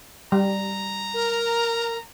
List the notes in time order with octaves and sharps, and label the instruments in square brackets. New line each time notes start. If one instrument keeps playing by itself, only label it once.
[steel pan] G3 [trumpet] A#5
[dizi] A#4